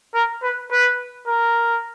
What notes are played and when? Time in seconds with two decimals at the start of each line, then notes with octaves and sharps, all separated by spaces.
0.15 A#4
0.43 B4
0.71 B4
1.28 A#4